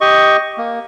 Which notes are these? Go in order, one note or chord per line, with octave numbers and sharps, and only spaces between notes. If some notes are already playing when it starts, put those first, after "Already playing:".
G4 D#5 C#6
A#3